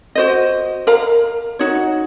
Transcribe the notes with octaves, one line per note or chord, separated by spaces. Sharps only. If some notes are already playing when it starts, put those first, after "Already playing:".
F#4 C5 D#5
A#4 F5 A#5
D#4 F#4 C#5